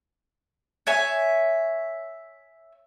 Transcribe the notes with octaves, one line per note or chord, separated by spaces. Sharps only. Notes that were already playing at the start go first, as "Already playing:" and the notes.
C#5 E5 G#5